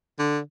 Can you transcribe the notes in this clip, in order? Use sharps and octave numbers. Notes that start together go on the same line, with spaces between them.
D3